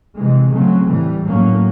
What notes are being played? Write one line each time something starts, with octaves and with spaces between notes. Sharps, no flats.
C3 E3 G#3
C#3 F#3 A3 C4
A2 E3 G3
A2 F#3 A#3 C#4